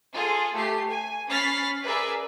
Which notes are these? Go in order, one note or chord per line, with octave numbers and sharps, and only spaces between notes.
F4 G#4 A4
A3 G4 C7
G#5
C#4 B5 F6 A6 B6 C7
G#4 A#4 B4 D5 E5